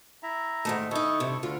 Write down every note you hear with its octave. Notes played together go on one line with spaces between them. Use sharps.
E4 E5 A#5
G#2 D#3 A3
D#3 D#4 E4 A4 C#6
G2 C3
D2 D3 F4